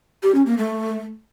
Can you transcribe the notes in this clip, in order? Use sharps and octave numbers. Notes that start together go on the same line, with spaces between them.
G4
C#4
A#3
A3